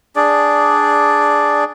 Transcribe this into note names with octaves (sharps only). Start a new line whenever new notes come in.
D4 G#4 D5